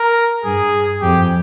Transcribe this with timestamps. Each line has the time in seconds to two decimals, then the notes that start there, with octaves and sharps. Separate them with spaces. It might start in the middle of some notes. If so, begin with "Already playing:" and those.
Already playing: A#4
0.44 G2 G#4
1.02 F2 G4